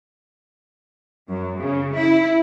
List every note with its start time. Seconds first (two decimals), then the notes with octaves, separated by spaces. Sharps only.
1.29 F#2
1.59 C#3
1.94 E4